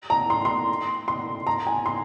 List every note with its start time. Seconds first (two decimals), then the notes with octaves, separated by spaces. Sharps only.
0.10 A#5
0.30 C6
0.45 C6
1.08 C6
1.47 A#5
1.67 G#5
1.86 C6